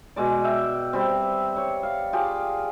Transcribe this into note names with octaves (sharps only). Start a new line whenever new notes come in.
B2 G#3 D5
E5 G5
G3 C4
C#5
F5
F4 G4 G#4 D5